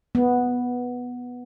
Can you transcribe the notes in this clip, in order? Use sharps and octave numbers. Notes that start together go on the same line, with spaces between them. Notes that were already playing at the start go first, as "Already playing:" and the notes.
B3